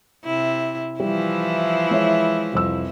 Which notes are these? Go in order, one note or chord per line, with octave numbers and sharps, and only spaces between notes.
C3 E4
E3 F3 G3 E4
G#3 C#5 E5
C2 F2 E6